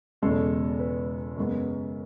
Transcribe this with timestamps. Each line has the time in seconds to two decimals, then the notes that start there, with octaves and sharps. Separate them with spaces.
0.22 E1 E2 C#3 G#3 C#4 A4
0.79 B4
1.37 F#2 C#3 G#3 B3